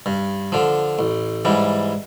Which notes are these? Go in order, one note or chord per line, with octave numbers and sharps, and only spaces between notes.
G2
D3 F3
A1
G#2 E3 G3